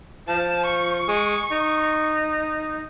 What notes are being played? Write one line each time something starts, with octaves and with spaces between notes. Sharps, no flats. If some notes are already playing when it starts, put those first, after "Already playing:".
F3 A5
C#6
G#3
D#4